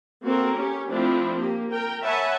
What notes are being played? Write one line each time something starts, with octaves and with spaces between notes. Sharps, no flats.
A#3 C4 F#4 A4 A#4
C#4 G4
F3 A3 C4 D4 E4
A#3 G4
A#4 G5
C#5 E5 F#5 G#5 A5 B5